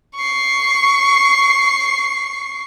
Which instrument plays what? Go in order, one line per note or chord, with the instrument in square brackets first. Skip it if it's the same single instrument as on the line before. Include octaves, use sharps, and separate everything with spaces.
[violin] C#6 C7